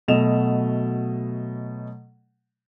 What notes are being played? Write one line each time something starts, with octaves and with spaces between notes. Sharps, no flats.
B2 F#3 A3 D#5 E7 F7